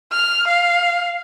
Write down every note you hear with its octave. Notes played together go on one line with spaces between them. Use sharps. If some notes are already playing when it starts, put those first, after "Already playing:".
F6
F5